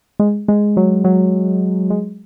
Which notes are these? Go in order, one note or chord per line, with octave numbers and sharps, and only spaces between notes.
G#3
G#3
F#3
F#3
G#3